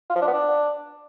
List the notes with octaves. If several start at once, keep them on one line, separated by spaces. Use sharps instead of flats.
F4
F3
D4
B3
D4